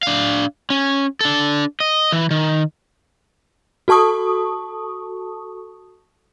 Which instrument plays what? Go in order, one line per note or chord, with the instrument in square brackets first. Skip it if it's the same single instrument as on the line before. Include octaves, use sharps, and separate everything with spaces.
[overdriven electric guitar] D4 F5
C#4
D4 A4
D#5
E3
D#3
[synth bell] F#4 A4 A5 C#6 D#6